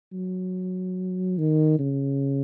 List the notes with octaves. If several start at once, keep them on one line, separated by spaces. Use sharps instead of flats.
F#3
D#3
C#3